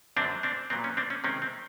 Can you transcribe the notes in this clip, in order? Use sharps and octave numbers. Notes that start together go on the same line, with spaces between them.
F#2 D3 F#3 B3 C4 D4
C4 D4
A#2 F#3 B3 C4
C#4
C4 D4
C#4
C3 D#3 G#3 C4 C#4
C4